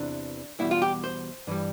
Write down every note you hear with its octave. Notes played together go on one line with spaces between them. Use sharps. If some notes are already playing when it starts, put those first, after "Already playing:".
Already playing: E2 C3 E3 D4
E2 B2 G3 E4
F4
G4
C5
G2 E3 G3